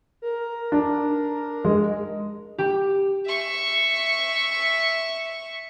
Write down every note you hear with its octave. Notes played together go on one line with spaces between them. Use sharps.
A#4
D4
G#3
G4
E5 C#6